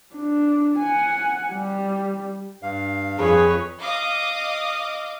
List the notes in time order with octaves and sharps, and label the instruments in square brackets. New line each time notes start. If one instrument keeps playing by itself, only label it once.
[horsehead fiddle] D4
F#5 G#5
G3
[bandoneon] G2 F5
[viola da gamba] F2 [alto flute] G#4 [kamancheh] B4 C#5
[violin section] D#5 F5 D6 D#6